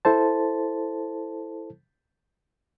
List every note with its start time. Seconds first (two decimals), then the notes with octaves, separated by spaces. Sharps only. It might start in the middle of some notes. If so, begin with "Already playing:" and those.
0.05 E4 A4 C5 A5